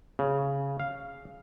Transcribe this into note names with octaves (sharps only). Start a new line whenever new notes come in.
C#3
F5